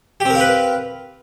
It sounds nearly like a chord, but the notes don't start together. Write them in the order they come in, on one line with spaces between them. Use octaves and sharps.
G4 C4 A#4 F5 B4